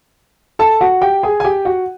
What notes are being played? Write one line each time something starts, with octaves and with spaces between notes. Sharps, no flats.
A4 A5
F#4 F#5
G4 G5
G#4 G#5
G#5
G4 G5
F#4 F#5